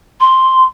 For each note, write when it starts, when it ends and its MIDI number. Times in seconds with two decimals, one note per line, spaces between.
0.21 0.64 84